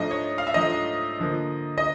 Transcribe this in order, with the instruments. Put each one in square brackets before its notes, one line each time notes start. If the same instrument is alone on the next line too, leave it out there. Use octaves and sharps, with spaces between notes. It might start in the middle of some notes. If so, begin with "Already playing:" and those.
Already playing: [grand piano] G#2 F3 A3 D4 D#5
C#5
F5
E5
G#2 F3 A3 D4 D#5
D3 F3 A#3
D#5